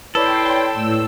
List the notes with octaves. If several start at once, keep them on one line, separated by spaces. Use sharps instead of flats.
E4 A4 B4 C#5 D5 G5 C6
A2 E6